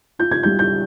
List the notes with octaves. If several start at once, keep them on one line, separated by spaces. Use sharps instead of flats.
F4 G6
G#6
G3 G6
G6